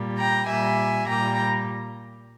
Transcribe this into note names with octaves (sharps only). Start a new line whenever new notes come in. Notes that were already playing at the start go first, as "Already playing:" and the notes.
Already playing: A#2 G3
G5 A#5
A#2 G3 E5 G#5
A#2 G3 G5 A#5